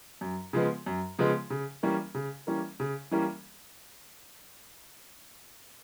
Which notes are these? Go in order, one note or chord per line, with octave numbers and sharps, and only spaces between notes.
F#2
C#3 F3 G#3 B3
F#2
C#3 F3 G#3 B3
C#3
E3 G3 A#3 C#4
C#3
E3 G3 A#3 C#4
C#3
E3 G3 A#3 C#4